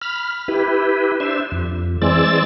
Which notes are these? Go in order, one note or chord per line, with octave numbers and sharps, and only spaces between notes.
B5 F6
E4 G4 B4
D4 C5 E5
F2
E3 G#3 C4 D5 E6 A6